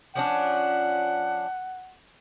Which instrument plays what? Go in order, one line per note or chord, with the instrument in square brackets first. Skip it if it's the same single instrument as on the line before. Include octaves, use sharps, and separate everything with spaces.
[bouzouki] F3 C#4 D4 [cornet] F#5